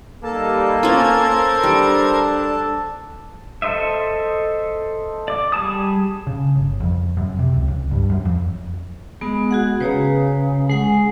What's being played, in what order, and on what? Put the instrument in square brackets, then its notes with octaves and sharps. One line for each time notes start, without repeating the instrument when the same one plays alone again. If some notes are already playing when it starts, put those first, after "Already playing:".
[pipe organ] G3 D#4 [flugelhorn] A#3 [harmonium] A4 A5
[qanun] C#4 F4 [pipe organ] A#4 C5 G#6
[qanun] G3 [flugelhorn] D4
[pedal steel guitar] A4 C5 D#5 E5
D5 D6
G3 G#4 A5 D#6
[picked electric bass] C#3
G1
F2
F#2
C3
C#2
C#2
G2
F#2
F2
[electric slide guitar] G#3 [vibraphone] B3
[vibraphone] F#4 G#4 F#5
[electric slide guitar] C#3 [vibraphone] B4 C#5 A#5
[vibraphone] G#3 F#5 [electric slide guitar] G#4